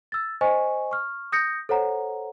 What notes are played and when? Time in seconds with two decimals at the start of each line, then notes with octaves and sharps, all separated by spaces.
0.12 E6 A6
0.41 C5 D#5 G#5 C#6
0.91 C#6 F6
1.32 D#6 G6 A#6 C#7
1.69 A4 C5 C#5 F#5 A#5